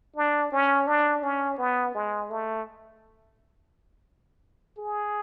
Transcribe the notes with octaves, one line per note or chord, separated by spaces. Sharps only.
D4
C#4
D4
C#4
B3
G#3
A3
G#4